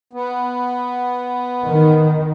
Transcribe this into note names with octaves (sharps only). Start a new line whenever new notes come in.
B3
D#3